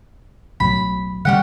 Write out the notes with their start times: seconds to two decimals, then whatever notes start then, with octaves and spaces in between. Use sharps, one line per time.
0.60 B1 A2 F#3 B5
1.25 D3 G3 C#4 G4 F#5